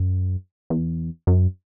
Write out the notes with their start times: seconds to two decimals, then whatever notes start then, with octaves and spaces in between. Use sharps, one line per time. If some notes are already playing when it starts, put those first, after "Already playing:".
Already playing: F#2
0.70 E2
1.27 F#2